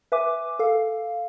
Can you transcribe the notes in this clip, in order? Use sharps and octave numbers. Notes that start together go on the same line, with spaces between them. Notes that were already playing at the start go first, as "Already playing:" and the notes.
B4 E5 G#5 D6
A4 F5